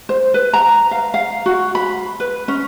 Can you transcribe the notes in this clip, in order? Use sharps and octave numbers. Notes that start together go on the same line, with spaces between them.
C5
B4
A#5
F5
F5
F#4
B5
B4
C#4